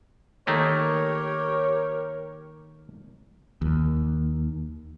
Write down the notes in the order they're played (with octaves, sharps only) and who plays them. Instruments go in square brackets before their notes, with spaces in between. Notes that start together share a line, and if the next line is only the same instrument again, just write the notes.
[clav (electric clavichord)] D#3 A3 A#3 [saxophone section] G4 A#4 C#5
[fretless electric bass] D#2